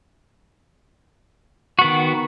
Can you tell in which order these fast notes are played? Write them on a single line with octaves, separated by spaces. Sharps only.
F#4 B3 D#3